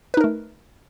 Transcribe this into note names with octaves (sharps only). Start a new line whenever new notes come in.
A3 D#4 A#4 B4